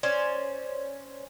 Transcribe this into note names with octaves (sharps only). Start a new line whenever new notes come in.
C#4 C5 D5